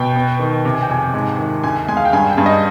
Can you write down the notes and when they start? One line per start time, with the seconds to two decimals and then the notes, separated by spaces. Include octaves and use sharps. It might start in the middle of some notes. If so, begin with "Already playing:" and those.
Already playing: B2 G5
0.16 B3
0.39 D#3
0.65 C3
0.74 G#5
0.82 G5
0.89 F2 G#5
1.14 G#2 G#5
1.38 D#3
1.64 D2 G#5
1.88 G#3 G#5
1.97 F5
2.05 G5
2.13 G2 G#5
2.30 G5
2.38 G2
2.46 D#5